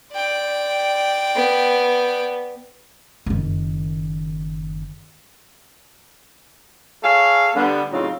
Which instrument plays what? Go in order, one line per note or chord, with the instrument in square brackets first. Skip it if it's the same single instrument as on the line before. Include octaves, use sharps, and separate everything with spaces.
[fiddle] D5 G5
[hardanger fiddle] B3
[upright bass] F#1 D#3
[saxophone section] G#4 A4 C#5 F5
D3 G3 B3
A2 C#3 F#3 C4 D#4 F4